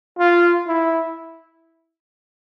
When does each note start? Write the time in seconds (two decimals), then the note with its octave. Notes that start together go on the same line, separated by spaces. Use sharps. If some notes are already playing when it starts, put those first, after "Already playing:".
0.18 F4
0.67 E4